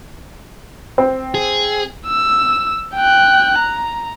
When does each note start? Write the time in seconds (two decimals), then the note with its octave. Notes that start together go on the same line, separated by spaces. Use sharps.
0.98 C4
1.34 G#4
2.07 E6
2.95 G5 F#6
3.59 A#5